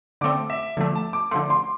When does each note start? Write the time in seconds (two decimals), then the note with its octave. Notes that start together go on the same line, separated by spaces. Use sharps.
0.21 D3 A3 C4 D6
0.50 E5
0.77 D3 F3 A3
0.95 A5
1.13 D6
1.31 D3 F3 A3 C6
1.50 C6